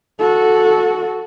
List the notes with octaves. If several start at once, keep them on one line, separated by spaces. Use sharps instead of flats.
F#4 A4